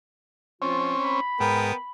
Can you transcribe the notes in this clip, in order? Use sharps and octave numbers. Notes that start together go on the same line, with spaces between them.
F3 C4 C#4 F4
B5
G#2 B3 A#4 G5